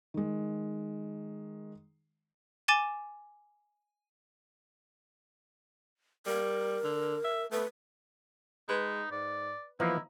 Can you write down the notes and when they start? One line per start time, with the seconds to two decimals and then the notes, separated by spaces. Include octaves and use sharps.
0.14 D#3 G#3
2.68 G#5 D6 A6 D#7 E7 G7
6.26 G3 A#4
6.84 D3
7.24 E5
7.52 A3 B4
8.69 G#3 D#4 B4
9.11 G#2 D5
9.80 E3 F3 A#3 B3 D#4 E4